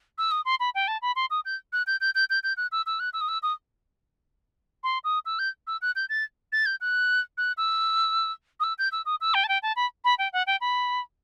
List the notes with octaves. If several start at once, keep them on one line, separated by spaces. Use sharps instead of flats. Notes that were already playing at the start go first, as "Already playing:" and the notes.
E6
D#6
C6
B5
G5
A5
B5
C6
D#6
G6
F#6
G6
G6
G6
G6
G6
F#6
E6
E6
F#6
E6
D#6
E6
D#6
C6
D#6
E6
G6
E6
F#6
G6
A6
A6
G6
F#6
F#6
E6
D#6
E6
G6
E6
D#6
E6
G5
A5
G5
A5
B5
B5
G5
F#5
G5
B5